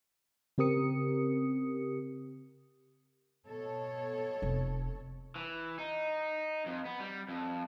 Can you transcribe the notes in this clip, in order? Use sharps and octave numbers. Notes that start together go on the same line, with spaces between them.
C#3 C4 G4 A#4 D#6 C#7
B2 A4 C#5
F1
E3
D#4
F2
B3
G3
F2